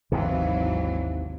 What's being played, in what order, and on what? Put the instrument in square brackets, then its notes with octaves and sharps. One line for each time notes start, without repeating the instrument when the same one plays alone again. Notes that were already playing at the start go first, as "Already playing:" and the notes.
[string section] G#1 E3 F#3 [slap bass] D#2 C3